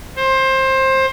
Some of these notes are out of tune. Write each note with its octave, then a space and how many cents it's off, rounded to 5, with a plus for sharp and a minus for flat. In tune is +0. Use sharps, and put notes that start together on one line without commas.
C5 +20